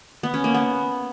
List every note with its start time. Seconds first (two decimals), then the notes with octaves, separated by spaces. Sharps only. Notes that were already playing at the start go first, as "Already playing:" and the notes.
0.23 B3
0.34 C#4
0.44 A#3
0.54 B3